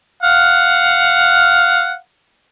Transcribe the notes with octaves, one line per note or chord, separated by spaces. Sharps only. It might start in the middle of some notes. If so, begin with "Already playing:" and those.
F5 F#5